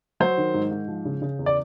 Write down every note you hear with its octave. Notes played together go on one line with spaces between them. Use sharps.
F#3 C5
D#3
G#2
G#2
F3
C#3
C#3
E2
D5